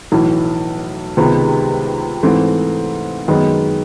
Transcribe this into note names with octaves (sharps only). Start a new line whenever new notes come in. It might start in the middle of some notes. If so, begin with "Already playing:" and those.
B1 A2 E3
C#2 C3 D#3 G#3 B3
G#2 E3 A3 C4
F#2 D#3 G#3 B3 D#4